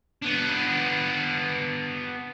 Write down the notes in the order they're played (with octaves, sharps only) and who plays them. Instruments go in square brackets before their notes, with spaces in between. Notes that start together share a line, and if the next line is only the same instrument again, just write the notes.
[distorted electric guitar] B3 D4